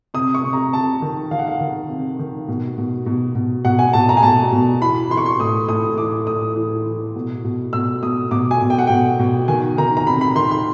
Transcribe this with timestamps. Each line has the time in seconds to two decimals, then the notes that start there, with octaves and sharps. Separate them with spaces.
0.14 C3 D#6
0.34 C#6
0.44 C3
0.53 A#5
0.73 C3 A5
1.02 D#3
1.31 D#3 F5
1.39 F#5
1.47 F5
1.61 D#3
1.89 C3
2.19 D#3
2.48 B2
2.78 B2
3.06 B2
3.35 B2
3.65 B2 F#5
3.79 G#5
3.93 B2 A5
4.09 A#5
4.17 G#5
4.23 B2 A5
4.52 B2
4.81 E3 B5
5.10 E3 C6
5.17 C#6
5.26 C6
5.39 A2 D#6
5.69 A2 D#6
5.98 E3 D6
6.27 A2 D#6
6.56 E3
6.86 E3
7.16 B2
7.44 B2
7.73 B2 E6
8.03 B2 D#6
8.31 B2 D6
8.51 G#5
8.61 B2
8.70 G5
8.78 F#5
8.87 B2 G5
9.19 B2
9.48 D#3 G#5
9.78 D#3 A#5
9.97 A#5
10.07 C3 B5
10.21 B5
10.36 D#3 C6
10.51 C6